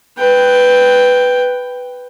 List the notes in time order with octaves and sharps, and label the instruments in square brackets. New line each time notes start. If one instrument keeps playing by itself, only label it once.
[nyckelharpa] B4 G5